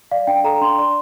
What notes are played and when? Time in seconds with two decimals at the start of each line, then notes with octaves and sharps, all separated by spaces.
0.11 D5 F5
0.27 D4 G5
0.44 A4 A#5
0.61 D4 C6
0.78 D5 C6